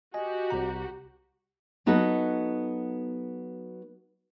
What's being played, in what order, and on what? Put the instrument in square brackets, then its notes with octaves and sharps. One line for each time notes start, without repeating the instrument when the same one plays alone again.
[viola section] F#4 G4 [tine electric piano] D#5 G#5
[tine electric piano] C2 C3 A#5
[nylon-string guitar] F#3 B3 D#4 F#4 A4